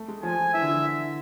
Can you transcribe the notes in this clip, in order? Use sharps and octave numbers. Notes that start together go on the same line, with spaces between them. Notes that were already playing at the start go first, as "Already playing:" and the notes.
Already playing: A3
G#3
F3 G#5
F3
E3 E5
D3
E3